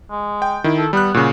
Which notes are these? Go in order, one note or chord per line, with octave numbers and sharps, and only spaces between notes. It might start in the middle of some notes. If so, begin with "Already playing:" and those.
G#3
G5
D#3 E4
A4
G3 B3 F#6
A#2 C#3 F#4